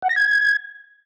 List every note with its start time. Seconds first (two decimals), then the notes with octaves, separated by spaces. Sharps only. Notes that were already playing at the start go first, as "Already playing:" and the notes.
0.02 F#5
0.09 A#6
0.16 G#6